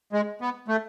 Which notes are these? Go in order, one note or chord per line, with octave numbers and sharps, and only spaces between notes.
G#3
B3
A3